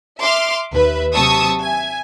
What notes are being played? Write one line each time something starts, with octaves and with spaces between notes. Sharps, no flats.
E5 C6 D6 F6
D#2 B4 E5
C3 F#3 A5 C#6 D#6 E6
E5 G#5